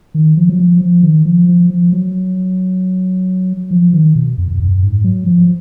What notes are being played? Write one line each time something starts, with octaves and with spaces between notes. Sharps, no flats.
D#3
F3
F#3
F3
F3
D#3
F3
F3
F3
F#3
F3
D#3
B2
F2
F2
F#2
G#2
F#3
F3